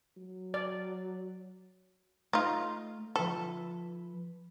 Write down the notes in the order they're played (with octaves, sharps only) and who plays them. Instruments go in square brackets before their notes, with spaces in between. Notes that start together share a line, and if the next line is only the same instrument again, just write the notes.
[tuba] F#3
[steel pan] D5
[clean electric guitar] A3 [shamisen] D#4 F4
[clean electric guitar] F3 B4 [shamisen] A4